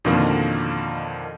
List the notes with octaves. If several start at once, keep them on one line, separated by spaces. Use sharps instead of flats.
F2 B2 D3 D#3 F3 A#3